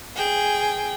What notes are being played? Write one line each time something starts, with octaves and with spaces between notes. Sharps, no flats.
G#4 G5